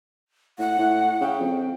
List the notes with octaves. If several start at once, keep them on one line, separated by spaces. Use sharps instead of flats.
A2 F#5
A2
C#3 G5
F2